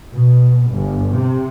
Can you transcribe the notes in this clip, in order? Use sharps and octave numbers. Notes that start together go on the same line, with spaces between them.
B2
G1
C3